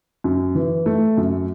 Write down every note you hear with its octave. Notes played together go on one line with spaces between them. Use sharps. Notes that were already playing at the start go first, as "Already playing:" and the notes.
F#2
E3
A3
F#2